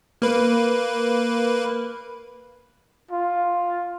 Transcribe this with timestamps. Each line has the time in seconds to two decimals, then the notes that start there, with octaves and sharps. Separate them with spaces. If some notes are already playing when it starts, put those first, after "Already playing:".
0.22 A#3 B4
3.11 F4